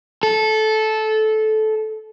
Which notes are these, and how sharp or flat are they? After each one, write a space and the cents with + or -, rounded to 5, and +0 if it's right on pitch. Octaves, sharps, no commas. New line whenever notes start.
A4 -15